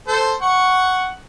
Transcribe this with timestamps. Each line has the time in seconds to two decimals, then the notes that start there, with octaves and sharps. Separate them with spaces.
0.08 A4 C5
0.42 F#5 C#6